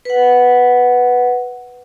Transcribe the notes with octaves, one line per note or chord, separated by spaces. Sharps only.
B4 F#5